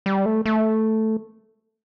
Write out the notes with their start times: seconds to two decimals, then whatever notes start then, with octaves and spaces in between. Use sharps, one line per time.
0.06 G3
0.26 A3
0.46 A3